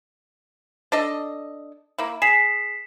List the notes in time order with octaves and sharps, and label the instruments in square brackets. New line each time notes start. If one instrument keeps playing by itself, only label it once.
[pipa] D4 A4 D#5
A#3 E4
[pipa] G#4 [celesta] B6 C7 E7